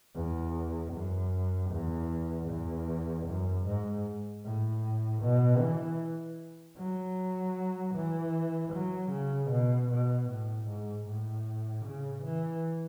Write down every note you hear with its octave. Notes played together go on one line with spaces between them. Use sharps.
E2
F#2
E2
E2
F#2
G#2
A2
B2
E3
F#3
E3
F#3
C#3
B2
B2
A2
G#2
A2
C#3
E3